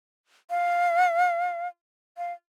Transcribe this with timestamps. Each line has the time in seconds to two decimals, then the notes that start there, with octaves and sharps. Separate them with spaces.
0.50 F5
2.17 F5